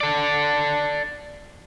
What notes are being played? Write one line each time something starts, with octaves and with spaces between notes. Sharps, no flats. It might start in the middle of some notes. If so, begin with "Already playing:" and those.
A4 D5